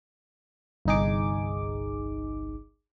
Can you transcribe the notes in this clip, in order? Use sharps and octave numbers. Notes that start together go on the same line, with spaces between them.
G1 C2 D#4 G#4 D6